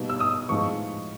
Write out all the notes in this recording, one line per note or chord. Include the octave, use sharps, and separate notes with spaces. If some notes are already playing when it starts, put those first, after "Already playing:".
Already playing: B2 G3 A#3 D#4
E6
D#6
A2 F3 G#3 B3 D#4 C#6